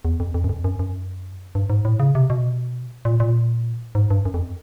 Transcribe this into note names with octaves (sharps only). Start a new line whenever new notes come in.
E2
F2
F2
F#2
F2
F#2
F#2
G2
G#2
A2
C#3
C3
B2
A#2
A#2
G#2
G2
F#2
F2